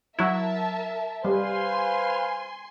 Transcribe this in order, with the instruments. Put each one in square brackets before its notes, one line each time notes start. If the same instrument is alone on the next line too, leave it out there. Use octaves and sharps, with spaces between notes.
[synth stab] F#3 E4 [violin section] A#4 E5 A5
[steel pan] G3 [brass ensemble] B4 C5 F5 [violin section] G#5 C6